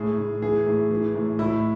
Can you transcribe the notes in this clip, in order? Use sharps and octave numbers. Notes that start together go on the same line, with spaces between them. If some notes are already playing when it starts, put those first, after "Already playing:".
Already playing: A2 G#4
A2
E3 G#4
A2
E3
A2
A2 E4